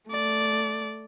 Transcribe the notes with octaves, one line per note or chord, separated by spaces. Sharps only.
A3 D5